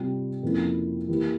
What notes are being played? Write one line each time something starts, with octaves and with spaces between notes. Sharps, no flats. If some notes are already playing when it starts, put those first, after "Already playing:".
Already playing: C3 G3 C4 F4
F2 C#3 F3 A#3 E4
E3 A#3 E4 G4